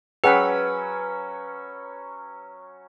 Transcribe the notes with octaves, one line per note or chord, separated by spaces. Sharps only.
F#3 C#4 G#4 B4 F#5 G5 B5